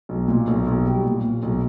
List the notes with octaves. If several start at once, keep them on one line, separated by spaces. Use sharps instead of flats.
B1
A#2
B1
B1
G3
A#2
A#2
B1